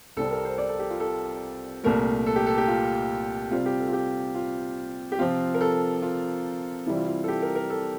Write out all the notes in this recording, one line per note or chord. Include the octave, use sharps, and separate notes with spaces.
C2 C3 G3 C4 A4
A#4
C5
D5
A4
G4
F4
A4
C2 A#2 A3 A#4
A4
G4
A4
G4
F4
C3 G3 C4 F4
G4
A4
F4
G4
F4
G4
C3 F3 C4 F4
A#4
A4
F4
C3 E3 G3 C4 E4
F4
F4
A4
G4
A#4
A#4
A4